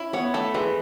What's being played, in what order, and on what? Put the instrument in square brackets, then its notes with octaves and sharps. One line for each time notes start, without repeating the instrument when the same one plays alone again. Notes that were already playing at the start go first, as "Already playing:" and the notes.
Already playing: [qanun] C#4 [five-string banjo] E4
[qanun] B3 [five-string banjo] C#5
[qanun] A3 [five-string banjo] A4
[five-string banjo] E3 [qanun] G#3